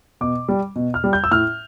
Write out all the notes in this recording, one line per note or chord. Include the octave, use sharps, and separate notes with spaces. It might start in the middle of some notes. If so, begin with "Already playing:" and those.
B2 D6
G3
B2
F6
G3
G6
E6
A2 F6